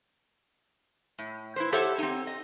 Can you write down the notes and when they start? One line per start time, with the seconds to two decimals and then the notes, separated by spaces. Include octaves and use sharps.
1.19 A2
1.56 E4 B4 C5
1.72 G4 A4 C5 C#5 E5 F#5
1.98 C4 D#4
2.27 D#5